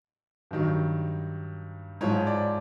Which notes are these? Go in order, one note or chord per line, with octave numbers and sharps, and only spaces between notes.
G2 D#3 F#3
G#2 F3 C#5
D5